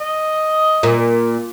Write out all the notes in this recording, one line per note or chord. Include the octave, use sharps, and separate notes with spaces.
D#5
A#2